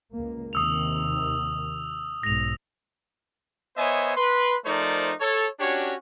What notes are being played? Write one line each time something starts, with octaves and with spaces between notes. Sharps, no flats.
C#2 A#3
D#2 C3 D#3 D#6 E6 F7
B1 G#2 A#6 F7
B3 C5 C#5 D#5 E5 G#5
B4 C6
F3 A3 D#4 A#4 C5 D5
A4 C#5
C#4 D4 F#4 G4 C#5